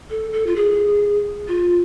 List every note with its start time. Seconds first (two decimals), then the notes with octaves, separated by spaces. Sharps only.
0.10 A4
0.33 A4
0.46 F4
0.56 G#4
1.48 F4